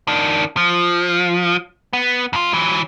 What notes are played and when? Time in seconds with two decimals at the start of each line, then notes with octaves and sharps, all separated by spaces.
0.08 D#3 D4
0.57 F3
1.93 B3
2.33 F2 F4
2.53 E3 F#3